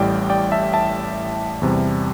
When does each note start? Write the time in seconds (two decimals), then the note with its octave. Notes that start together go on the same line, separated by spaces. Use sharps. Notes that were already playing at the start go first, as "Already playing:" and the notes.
Already playing: A1 A2 G3 D5 G5
0.30 D5 G5
0.52 E5 A5
0.73 E5 A5
1.62 E2 C3 G3